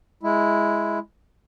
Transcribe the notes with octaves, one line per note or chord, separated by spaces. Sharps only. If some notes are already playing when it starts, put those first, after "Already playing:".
G#3 E4